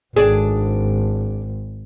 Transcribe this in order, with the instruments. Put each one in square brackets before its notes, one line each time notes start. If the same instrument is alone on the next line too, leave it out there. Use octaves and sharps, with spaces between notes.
[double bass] G#1 [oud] D4 G#4